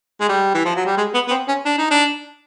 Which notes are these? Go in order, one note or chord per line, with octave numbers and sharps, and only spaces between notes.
G#3
G3
E3
F3
F#3
G3
G#3
B3
B3
C4
C#4
D4
D#4
D4